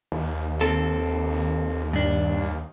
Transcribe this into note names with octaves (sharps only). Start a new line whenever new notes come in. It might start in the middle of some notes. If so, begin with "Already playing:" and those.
D#2
C4 A4
G2 D4